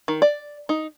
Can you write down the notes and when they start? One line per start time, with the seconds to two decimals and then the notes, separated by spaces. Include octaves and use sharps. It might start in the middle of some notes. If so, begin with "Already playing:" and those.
0.08 D#3
0.22 D5
0.69 D#4